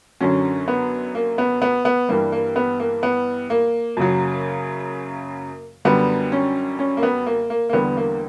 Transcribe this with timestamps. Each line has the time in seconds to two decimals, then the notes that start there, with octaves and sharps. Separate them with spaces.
0.21 F#2 D3 F#3 C#4
0.68 B3
1.15 A#3
1.38 B3
1.62 B3
1.85 B3
2.09 G2 E3 G3 A#3
2.32 A#3
2.56 B3
2.80 A#3
3.03 B3
3.50 A#3
3.97 F#2 C#3 F#3
5.85 F#2 D3 G3 B3
6.32 C#4
6.79 C#4
6.97 A#3
7.03 B3
7.26 A#3
7.50 A#3
7.69 A#3
7.73 E2 D3 G3 B3
7.97 A#3